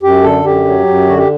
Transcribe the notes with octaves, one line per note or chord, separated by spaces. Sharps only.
F#2 G4
D3 A4
F#2 G4
F#3
F#2
D3 F#4
G4